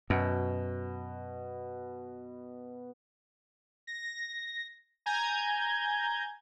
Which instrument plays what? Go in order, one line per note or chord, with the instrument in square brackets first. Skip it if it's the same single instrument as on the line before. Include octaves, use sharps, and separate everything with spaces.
[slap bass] F#2 [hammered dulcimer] B2
[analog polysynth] A#6
G#5 A#5 G6 G#6